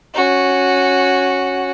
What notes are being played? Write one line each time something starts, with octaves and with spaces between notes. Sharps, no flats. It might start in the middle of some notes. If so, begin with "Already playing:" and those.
C#4 F#4